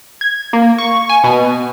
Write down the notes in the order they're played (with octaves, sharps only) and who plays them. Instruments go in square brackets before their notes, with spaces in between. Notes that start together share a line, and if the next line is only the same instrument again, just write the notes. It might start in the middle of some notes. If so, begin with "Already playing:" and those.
[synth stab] G#6
A#3
C#6
G#5
B2